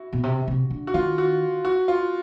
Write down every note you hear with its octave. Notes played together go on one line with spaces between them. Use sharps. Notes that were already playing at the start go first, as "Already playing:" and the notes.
Already playing: E4 F#4
B2
C3
C3
D3
F#4
D#3 F4
F#4
F#4
F4